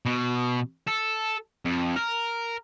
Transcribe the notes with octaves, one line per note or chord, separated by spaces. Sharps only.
B2
A4
F2
A#4